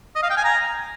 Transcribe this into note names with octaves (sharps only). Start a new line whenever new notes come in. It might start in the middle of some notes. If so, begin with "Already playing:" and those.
D#5
F5
G5
G#5
A#5